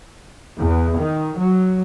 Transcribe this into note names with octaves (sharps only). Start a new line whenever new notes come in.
E2
D#3
F#3